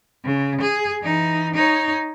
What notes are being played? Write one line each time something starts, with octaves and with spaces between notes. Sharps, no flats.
C#3
G#4
E3 D#4
D#4 C#5